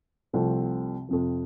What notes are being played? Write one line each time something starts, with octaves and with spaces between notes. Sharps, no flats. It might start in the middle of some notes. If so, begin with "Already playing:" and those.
C2 C3 F3 A3 C4
F2 C3 F3